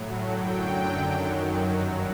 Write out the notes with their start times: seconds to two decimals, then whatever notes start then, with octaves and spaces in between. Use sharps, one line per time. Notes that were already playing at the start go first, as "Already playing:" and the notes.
Already playing: A2 F#3
0.24 F#2 D3 F#3 G5
0.93 F#2 D#3 F#3
1.63 G2 F#3